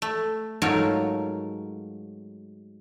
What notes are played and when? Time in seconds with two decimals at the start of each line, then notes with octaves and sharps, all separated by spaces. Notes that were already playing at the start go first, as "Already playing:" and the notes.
0.02 A3
0.62 G#2 F#3 A3 F4 A#4 C#5